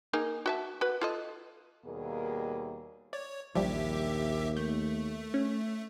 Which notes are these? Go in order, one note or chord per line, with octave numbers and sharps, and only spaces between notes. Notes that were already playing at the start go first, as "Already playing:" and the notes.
A#3 D#4 G#4
F#4 E5 A5
F#4 B4
F4 A4 D#5
D#2 B2 G3 A#3 G#4 A#4
C#5 D5
A#1 D#2 F3 G3 G4 E5
A3 G6
C#4